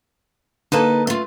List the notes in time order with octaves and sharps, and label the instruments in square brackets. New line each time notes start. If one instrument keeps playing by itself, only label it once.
[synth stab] D3 A#3 A4 [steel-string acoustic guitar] D#4 B4 A5
[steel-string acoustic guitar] A3 F4